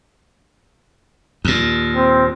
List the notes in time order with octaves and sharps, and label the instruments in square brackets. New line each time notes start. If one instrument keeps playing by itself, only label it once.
[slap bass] D#2 A#2
[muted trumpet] C4